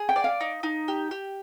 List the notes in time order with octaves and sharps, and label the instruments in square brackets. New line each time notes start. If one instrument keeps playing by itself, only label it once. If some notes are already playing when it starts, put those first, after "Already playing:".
Already playing: [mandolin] G#4
[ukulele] G5
[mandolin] D5
[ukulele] F5
[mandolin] D#4
D#4
G4
G4